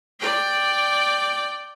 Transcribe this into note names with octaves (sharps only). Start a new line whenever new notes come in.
D5 G5